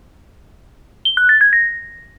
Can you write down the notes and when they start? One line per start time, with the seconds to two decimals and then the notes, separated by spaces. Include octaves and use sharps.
1.05 G7
1.17 F#6
1.29 A6
1.41 G#6
1.53 A#6